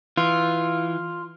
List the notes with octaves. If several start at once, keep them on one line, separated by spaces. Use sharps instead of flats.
E3 F4